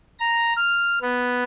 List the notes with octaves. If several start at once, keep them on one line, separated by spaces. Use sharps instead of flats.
A#5
F6
B3